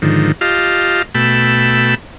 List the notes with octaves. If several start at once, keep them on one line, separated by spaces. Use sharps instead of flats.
G#2 D3 D#3 F3
F4 G4 D#5 F5 A5 F6
B2 A3 G5 A5 B5 E6